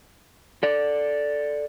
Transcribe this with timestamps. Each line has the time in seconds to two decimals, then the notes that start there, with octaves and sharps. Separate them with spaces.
0.63 A4 D5